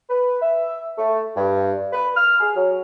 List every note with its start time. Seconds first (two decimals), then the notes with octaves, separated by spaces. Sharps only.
0.10 B4
0.42 E5
0.98 A3
1.36 G2
1.92 B4
2.16 F6
2.40 G#4
2.56 F#3